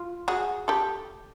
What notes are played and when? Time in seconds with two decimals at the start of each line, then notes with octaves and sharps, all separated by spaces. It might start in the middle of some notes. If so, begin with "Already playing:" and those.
Already playing: F4
0.28 F#4 G#4
0.68 G4 A4